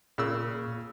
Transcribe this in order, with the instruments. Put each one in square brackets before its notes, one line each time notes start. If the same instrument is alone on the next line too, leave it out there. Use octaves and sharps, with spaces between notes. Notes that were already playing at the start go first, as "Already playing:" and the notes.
[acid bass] A#2 [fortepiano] C#3 E6